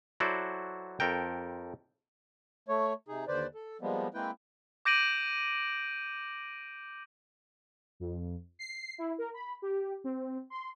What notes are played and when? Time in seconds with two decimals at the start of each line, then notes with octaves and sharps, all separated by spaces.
0.20 F#3 E4 F#4 A4 C5 D5
1.00 F2 A4 A#4 G5
2.69 A3 C#5
3.08 C3 D#4 G#4
3.28 D#2 D3 B4 C5 D5
3.55 A4
3.81 F3 G3 G#3 A#3 B3
4.14 G#3 A#3 C4 E4 B4 G5
4.85 D6 G6 A#6 D7 D#7 F#7
8.00 F2
8.59 C7
8.98 E4
9.18 A#4
9.34 B5
9.62 G4
10.04 C4
10.50 C6